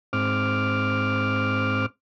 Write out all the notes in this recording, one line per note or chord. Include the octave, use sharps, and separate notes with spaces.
G#2 C4 D6 F6